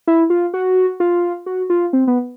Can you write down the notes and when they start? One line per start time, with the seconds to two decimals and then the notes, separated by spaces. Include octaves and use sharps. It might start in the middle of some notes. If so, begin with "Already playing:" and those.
0.07 E4
0.30 F4
0.54 F#4
1.00 F4
1.46 F#4
1.70 F4
1.93 C4
2.07 B3